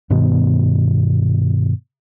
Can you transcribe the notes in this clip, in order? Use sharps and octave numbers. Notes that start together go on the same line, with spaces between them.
G2 B2 D#3 B3